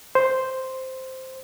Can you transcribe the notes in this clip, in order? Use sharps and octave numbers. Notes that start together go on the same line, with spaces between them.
C5